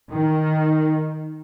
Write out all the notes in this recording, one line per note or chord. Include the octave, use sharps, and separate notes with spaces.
D#3